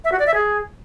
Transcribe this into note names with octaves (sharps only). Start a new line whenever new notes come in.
E5
F#4
D5
E5
G#4